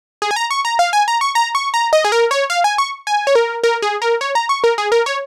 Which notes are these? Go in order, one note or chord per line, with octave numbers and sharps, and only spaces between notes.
G#4
G#5
A#5
C#6
A#5
F5
G#5
A#5
C#6
A#5
C#6
A#5
D#5
G#4
A#4
C#5
F5
G#5
C#6
G#5
C#5
A#4
A#4
G#4
A#4
C#5
A#5
C#6
A#4
G#4
A#4
C#5